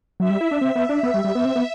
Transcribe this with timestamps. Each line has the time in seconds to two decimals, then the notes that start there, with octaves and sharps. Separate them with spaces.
0.20 F#3 E5
0.30 G3
0.41 E4
0.51 D4
0.61 C4
0.76 B3
0.89 D4
1.03 B3
1.14 G3
1.24 G3
1.35 B3
1.45 C4
1.56 B3